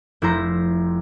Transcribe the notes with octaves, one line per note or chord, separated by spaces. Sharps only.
F1 E4 C5 A#5